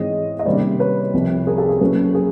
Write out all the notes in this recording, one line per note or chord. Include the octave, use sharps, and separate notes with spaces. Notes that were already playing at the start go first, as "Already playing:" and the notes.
Already playing: G#2 E3 G#3 C4 C#5 D#5
D#5
C3 D#3 G3 A#3 C#4 C5 D5
B4 C#5
C2 C3 F3
G#4 A#4
G4 A4
G#4
C#3 F#3 A#3 C#4 A4 B4
G#4 A#4